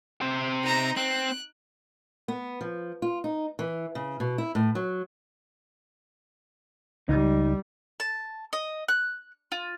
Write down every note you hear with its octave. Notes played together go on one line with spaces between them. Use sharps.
C3 C5
D#4 A#5
C4 F#6
B3
F3
F4
D#4
E3
C#3
B2
E4
A2
F#3
C#2 G3 D#4
A5
D#5
F#6
F4